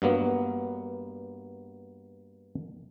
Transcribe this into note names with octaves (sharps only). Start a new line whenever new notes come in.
G2 F#3 A#3 B3